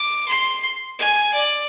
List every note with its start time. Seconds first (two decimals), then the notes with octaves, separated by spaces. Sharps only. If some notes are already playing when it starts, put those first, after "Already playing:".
Already playing: D6
0.28 C6
0.99 G#5
1.33 D5